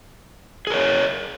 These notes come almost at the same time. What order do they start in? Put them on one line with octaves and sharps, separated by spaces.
G#4 A#4 C#5